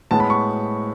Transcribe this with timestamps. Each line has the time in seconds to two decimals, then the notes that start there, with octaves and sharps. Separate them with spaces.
0.11 A2 G#3 B3 A5
0.20 B5
0.30 C#6